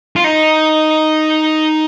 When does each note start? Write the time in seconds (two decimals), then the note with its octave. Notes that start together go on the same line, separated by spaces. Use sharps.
0.16 F4
0.24 D#4